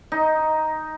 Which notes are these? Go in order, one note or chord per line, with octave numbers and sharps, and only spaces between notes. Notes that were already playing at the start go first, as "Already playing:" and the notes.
D#4